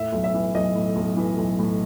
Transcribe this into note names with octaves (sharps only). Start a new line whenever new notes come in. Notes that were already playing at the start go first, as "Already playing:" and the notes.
Already playing: A2 E5
B1
E5
E3
B1 D#5
A2
B1
E3
B1
A2